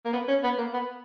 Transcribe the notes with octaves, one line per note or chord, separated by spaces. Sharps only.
A#3
B3
C#4
B3
A#3
B3